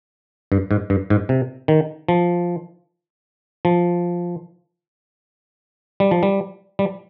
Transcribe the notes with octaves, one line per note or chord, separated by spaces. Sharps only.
G2
G#2
G2
G#2
C3
D#3
F3
F3
G3
F3
G3
G3